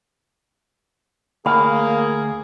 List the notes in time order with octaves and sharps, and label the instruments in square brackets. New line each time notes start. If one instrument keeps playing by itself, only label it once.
[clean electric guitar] D2 C#5 F5 [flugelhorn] A#3 [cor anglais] G#4 [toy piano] B5